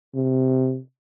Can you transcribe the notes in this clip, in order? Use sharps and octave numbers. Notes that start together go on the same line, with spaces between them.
C3